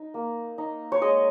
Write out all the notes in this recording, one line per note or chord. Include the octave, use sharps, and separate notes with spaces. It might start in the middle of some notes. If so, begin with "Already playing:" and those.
Already playing: D#4
A#3
D#4
C#5
G#3 D#5